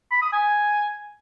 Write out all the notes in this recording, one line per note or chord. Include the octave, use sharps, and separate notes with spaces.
B5
D#6
G#5